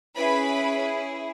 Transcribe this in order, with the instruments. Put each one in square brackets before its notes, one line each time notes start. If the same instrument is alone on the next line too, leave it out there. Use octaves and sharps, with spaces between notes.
[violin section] C#4 E4 G#4 B4 B5